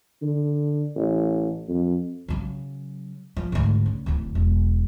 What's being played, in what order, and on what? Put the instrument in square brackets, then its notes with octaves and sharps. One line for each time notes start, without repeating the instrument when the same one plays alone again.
[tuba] D3
A1
F2
[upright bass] C#3 F#3
F3
D2 G#2
C#3
D1 D2
E1